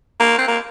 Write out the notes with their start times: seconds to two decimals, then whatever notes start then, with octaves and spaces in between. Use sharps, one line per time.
0.20 A#3
0.38 C4
0.48 A#3